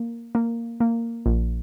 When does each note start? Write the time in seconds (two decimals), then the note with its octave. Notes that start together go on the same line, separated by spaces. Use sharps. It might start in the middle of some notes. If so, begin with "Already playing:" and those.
Already playing: A#3
0.35 A#3
0.80 A#3
1.26 A#1